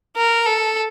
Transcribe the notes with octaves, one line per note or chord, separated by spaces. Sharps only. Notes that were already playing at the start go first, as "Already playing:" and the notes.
A#4
A4